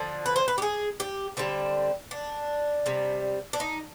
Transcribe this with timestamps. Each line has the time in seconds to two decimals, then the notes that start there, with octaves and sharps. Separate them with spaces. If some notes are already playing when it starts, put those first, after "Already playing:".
Already playing: D3 F3
0.26 B4
0.36 C5
0.48 B4
0.58 G4
0.62 G#4
1.00 G4
1.37 D3 G3 C4
2.11 D4
2.86 C3 G3
3.53 D4
3.60 D#4